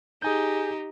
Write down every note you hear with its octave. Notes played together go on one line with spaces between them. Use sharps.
D#4 G4 G#4 G#5 G6